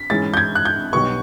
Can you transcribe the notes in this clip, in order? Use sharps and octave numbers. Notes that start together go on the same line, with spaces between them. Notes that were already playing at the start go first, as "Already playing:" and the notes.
Already playing: B6
G#2 E3 G#3 C#4 E4 A6
G6
G#6
F#6
G6
B1 B2 G3 B3 C#6